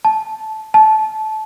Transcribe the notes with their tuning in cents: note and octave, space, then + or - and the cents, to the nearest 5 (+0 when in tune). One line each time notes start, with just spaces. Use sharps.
A5 -10
A5 -20